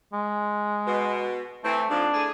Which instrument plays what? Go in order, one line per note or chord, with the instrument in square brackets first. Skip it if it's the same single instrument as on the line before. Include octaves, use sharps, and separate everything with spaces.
[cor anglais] G#3
[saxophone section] B2
[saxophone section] E3 C4 [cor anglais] A3
[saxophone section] F2 G#2 F3 [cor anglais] D4
[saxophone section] A2 G#4